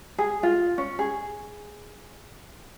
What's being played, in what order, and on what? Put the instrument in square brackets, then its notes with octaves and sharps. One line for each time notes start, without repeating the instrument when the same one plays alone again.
[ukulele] G#4
F4
C#4
G#4